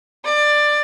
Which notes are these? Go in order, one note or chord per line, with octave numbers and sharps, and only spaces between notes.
D5